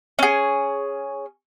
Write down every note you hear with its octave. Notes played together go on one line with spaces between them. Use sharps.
C#4 G#4